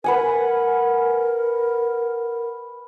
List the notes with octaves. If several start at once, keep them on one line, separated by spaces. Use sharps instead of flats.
A#4 B4 F#5 G#5